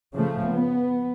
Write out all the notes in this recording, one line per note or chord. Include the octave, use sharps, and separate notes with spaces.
C#3 F3 A3
B3